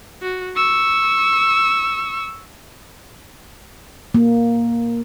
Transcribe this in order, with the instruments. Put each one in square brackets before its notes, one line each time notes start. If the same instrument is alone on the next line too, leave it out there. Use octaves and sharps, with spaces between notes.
[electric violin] F#4
C#6 E6
[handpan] A#3